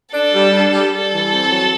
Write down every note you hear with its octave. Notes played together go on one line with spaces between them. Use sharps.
D4 A4
G3
D4
G3
G3 A4
E3
C4
F#3